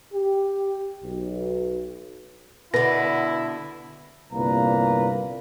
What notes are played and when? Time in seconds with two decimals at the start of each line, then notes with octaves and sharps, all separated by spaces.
0.13 G4
1.04 B1
2.74 B2 D3 E4 B4 A#6
4.33 G1 C2 A#2 A#3 B4 A#5